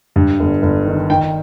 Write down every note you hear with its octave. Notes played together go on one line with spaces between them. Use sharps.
G2
G1
G1
D#3
D#3 G5